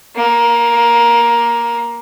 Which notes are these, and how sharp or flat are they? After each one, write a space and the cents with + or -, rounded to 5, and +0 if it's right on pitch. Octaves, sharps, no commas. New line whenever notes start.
A#3 +15